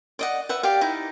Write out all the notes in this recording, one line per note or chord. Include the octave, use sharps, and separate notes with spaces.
D5 D#5 F#5
B4 E5 F#5
G4 D5 F5
D#4 E4